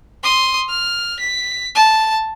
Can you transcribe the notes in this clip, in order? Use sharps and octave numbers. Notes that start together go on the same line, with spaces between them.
C6 D#6
F6
B6
A5